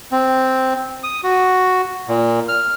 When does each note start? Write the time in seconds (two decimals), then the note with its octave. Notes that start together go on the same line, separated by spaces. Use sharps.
0.12 C4
1.04 D#6
1.23 F#4
2.08 A#2
2.48 F6